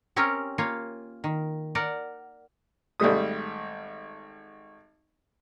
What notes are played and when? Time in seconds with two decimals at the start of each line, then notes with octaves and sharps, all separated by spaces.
0.16 C4 C#4 G4 A#4 C#5
0.58 A#3 F4 C#5
1.24 D#3
1.75 A#4 D5 F#5
3.00 G#1 G3 A3 D#6